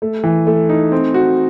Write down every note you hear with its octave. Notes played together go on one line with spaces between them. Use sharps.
A3
E3
A3
D#4
C4
F#4